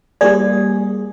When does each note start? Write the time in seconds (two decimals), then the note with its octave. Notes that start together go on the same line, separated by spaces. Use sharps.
0.21 G3 A#3 G4 G#4 D5